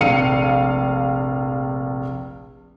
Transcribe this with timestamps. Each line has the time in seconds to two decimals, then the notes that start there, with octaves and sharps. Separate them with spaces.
0.01 F1 A#1 F5 C#7 D#7